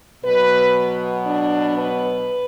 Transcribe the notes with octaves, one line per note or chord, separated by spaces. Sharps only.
B2 F#3 B3 B4
D4
B4